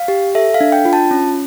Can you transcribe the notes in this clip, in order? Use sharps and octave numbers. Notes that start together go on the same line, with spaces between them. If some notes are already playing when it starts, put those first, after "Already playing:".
Already playing: F5
G4
A4 E5
F5
D4
G5
F4
A5
C#4